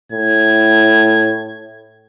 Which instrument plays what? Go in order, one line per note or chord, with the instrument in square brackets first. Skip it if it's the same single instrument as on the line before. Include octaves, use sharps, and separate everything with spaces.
[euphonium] A2 [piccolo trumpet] G#6